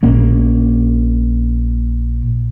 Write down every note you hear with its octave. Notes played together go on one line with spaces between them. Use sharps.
A#1 A#3 C#4